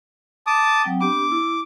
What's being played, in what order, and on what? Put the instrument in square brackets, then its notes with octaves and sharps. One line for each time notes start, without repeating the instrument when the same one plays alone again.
[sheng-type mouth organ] A5 D6 D#6
[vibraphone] F#3 C4 G5
[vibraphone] B3 D4 G4 [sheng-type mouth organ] D6
[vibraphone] E4